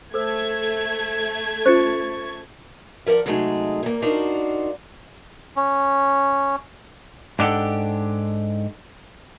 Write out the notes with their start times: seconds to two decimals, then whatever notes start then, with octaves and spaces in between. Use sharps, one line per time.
0.14 A3 A4 C5 E6 G#6
1.66 C#4 F4 C5 C#6 A6 C#7
3.06 F3 A#4 D5 F#5
3.26 C3 F#3 G#3 A3 D#4 G#4
3.83 A#2 A#3
4.02 D4 D#4 F4 F#4 A#4 C5
5.56 C#4
7.39 G#2 D4 F#4 G4 A4 F#5